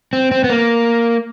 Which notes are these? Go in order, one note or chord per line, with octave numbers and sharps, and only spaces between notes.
C4
C4
B3
A#3